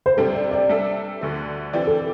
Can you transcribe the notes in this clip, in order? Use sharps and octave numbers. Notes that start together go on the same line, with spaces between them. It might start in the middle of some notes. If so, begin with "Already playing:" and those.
C5
C3 G3 D4 G4 A4
D5
D5
G3 D4 A4 E5
D2 D3 A3
E3 C4 G4 D5
A4